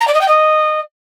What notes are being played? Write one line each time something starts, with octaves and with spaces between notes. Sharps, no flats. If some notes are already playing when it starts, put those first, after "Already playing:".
A#5
D5
D#5
G5
D#5